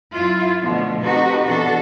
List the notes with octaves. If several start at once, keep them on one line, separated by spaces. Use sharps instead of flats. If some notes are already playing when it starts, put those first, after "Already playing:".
F#2 E4 F4
B2 D3 F3 A3
C4 D#4 F#4 G4 A4 B4
B2 E3 D4 F#4 A4